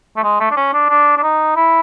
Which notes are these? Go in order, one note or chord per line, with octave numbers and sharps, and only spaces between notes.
A3
G#3
A3
D4
C#4
D4
D4
D4
D#4
E4